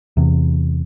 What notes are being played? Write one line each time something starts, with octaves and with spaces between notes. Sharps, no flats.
E2 C3